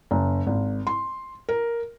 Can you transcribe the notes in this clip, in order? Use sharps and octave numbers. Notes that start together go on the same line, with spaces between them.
F#1
G#1
C6
A#4